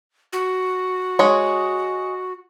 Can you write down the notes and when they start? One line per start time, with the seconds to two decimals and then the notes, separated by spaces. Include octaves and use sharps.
0.33 F#4
1.19 G#3 C#5